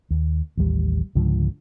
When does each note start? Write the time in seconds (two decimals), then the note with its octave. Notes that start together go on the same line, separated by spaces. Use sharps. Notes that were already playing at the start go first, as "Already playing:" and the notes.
0.11 D#2
0.57 A1 D#2 G3
1.15 C#2 G#2 D3 F3